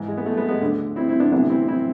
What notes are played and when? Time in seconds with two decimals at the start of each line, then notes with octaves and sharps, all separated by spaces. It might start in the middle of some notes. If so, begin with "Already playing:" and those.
Already playing: G#2 E3
0.08 G#3
0.17 B3
0.26 A3
0.37 G#3 B3
0.49 G#3 B3
0.61 D2 D3
0.96 C4 E4
1.09 C4 E4
1.20 B3 D4
1.32 D2 C3 E3 B3 D4
1.50 C4 E4
1.68 C4 E4